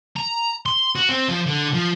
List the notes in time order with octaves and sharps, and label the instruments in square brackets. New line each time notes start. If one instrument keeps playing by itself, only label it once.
[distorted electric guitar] A#5
C6
F#4
C4
F3
D3
F3